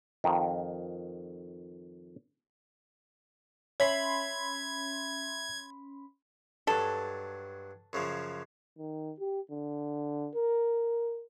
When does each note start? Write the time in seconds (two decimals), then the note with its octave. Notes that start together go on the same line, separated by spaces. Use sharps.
0.24 F2 D#3
3.80 C#4 C#5 E5 B5 C6 G#6
6.67 G2 F#3 A4
7.93 F#2 C#3 F3
8.79 D#3
9.20 G4
9.51 D3
10.35 A#4